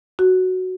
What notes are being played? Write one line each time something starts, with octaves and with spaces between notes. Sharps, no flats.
F#4